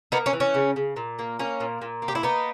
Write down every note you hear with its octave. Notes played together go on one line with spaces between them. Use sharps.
A#3 B3 D#4
C#4
E3
C#4
C#3
C#3
A#2
A#3
A#3 C#4
A#2
A#2
A#3
G4
E4
A#3 B3 D#4